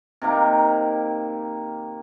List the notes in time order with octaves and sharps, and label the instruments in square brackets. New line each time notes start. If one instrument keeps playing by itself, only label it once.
[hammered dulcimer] C3 D#3 A#3